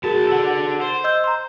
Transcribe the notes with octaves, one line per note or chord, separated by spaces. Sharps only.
B1 F#4 G#4 A#4 A5
A4 F#5
C5
D#5 E6 G6
A#5 C6